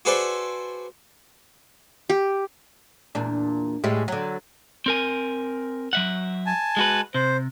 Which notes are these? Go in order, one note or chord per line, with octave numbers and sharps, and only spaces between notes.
F#4 G#4 A4 B4 C5 D5
G4
E2 A#2 D4
A2 G3 G#3
D3 F#3
C4 A#4 G#5
F#3 E5 F#5
G#5 A5
G#3 F#4 B4
C3 C5